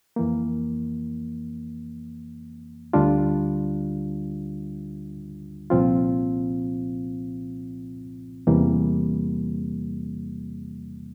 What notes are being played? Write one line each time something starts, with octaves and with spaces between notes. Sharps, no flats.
F2 E3 A#3
D2 D3 G3 D4 F4
C2 A#2 F3 C4 F4
E2 C3 E3 G3 A#3